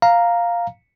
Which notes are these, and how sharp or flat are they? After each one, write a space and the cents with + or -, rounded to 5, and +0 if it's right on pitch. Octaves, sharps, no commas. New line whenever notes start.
F5 +0 A#5 +0